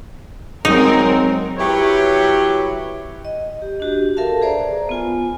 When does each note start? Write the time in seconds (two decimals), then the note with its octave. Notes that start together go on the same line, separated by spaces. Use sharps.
0.65 F#3 G#3 C4 D#4 A#4
1.59 F#3 E4 G4 B4 C#5
3.25 D#5
3.62 G4
3.80 D4 F#4 G4
4.17 A4 A#4 E5 F5 A5
4.41 G#4 B4 C5 D5 A#5
4.89 B3 F4 G#5